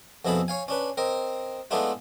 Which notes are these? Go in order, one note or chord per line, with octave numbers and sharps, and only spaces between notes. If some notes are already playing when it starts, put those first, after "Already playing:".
F2 B2 E4 G#4 A4 B5
C#5 F5 G#5
C#4 D4 B4
C4 A#4 D#5
G#3 A3 B3 D4 E4 F4